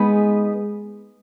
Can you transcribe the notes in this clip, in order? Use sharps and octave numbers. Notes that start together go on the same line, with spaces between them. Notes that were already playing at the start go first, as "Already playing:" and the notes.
Already playing: G#3 B3 D#4 G#4 B4